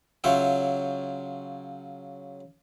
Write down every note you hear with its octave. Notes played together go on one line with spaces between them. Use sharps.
C#3 F#3 F4 C#5 E5 G5